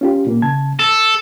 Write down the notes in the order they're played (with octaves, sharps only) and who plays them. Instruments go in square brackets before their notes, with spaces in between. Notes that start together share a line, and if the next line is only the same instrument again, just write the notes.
[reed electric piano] C#4 F4 G4
A#2 A#3
C#3 A5 G#6
[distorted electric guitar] A4 [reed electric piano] E6